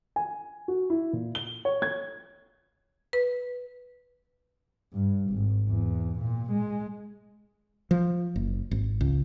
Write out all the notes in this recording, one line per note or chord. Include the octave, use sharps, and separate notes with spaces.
G#5
F#4
E4
A#2
G7
C#5
G#6
B4
G2
G#1
E2
A#2
G#3
F3
F#1
G#1
C#2